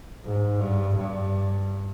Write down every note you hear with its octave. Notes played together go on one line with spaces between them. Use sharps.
G#2
G2
G2